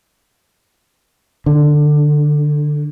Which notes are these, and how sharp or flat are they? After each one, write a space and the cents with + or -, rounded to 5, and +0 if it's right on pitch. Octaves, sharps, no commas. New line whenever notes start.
D3 +15